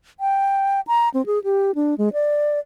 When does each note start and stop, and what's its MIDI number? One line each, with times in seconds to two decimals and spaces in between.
0.20 0.81 79
0.87 1.09 82
1.14 1.25 60
1.26 1.43 68
1.44 1.75 67
1.75 1.97 62
1.98 2.09 56
2.13 2.59 74